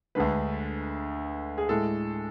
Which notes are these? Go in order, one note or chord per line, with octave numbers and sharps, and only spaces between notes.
D2 D3 G#3 B4
G#4
A2 G#3 A4